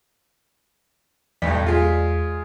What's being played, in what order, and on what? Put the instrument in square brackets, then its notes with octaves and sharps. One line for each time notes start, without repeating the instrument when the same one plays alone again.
[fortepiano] B1 A2 G3 [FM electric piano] E2 D5 B6
[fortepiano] G#3 F4